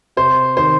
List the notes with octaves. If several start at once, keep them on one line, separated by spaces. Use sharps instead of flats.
C3 C5
D#3 C5